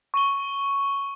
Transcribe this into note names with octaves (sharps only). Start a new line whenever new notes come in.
C#6 D#7 G7